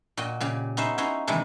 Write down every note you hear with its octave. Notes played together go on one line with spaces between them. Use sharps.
A#2 F#4 D#5 G5
A#2 C#3 G4
B3 C#4 D#4 C5 E5
C#4 D#4 E4 F#4 C5 C#5
C3 D#3 E3 G3 G#3 D4